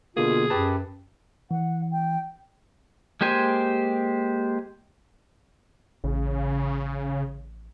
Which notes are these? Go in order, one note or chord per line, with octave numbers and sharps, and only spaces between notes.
B2 D3 A#3 F4 G#4
F#2 G4 B4 A5
E3 F#5
G5
G#3 A#3 G4 C5 G#5
A1 C#3